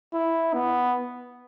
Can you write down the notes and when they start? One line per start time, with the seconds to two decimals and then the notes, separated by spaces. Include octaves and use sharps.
0.13 E4
0.54 B3